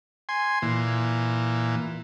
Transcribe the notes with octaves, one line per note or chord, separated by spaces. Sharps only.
G#5 C6
A#2 E3